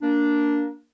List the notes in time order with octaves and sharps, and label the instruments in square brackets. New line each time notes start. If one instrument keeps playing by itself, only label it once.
[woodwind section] A#3 D4